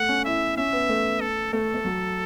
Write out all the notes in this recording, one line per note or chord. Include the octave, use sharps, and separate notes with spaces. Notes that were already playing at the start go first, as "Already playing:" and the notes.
Already playing: A3 F#5
C#4
E4 E5
C#4 E5
B3
A3
A4
A3 A4
A3
F#3